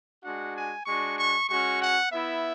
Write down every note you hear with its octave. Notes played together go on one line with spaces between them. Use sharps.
G#3 D4 F#4 F#5
G#5
G#3 D4 F#4 C#6
C#6
G#3 C#4 F#4 C#6
F#5
B3 E4 E5